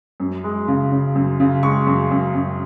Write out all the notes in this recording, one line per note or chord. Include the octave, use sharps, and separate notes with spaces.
F#2
G#3
C#3
C#3
F#2
C#3
G#3 C#6
F#2
F#2
F#2